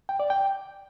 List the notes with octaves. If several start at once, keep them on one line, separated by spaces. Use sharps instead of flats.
G5
D5
G5